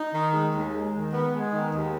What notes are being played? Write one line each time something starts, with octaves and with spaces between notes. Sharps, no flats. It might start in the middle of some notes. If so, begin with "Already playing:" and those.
Already playing: D#4
D#3
G#3
D#2
G#3
D#3
B3
G#3
D#3
D#2